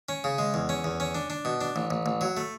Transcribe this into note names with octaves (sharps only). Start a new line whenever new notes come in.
C#4
C#3
G#3
E2
C#4
E2
C#4
D4
D4
B2
D4
A1
A1
A1
F#3
A3